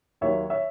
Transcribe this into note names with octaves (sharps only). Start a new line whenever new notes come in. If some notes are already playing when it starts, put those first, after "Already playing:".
D#2 D#3 F#3 C#5 E5
C#5 E5